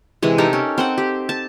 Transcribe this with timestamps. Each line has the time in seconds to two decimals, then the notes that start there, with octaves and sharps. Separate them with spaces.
0.22 C3 E3 G#3
0.38 D#4 G4 A4 A#4
0.53 C#4
0.78 C4 C5 F#5
0.98 G4
1.29 A5